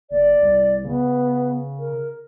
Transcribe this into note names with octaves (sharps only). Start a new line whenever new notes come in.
F#1 D5
C2
C#3 B3
A#4